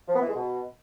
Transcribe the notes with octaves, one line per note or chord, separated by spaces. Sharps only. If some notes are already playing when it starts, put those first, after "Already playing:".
F3
B3
E3
G#3
B2